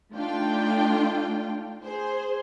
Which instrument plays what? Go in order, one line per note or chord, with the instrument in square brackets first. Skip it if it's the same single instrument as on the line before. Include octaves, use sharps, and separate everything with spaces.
[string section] A3 D4 D#4 F4 G5
G#4 C5